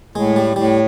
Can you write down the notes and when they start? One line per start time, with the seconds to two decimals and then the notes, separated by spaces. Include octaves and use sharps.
0.15 A2 G#3
0.36 G3
0.56 A2 G3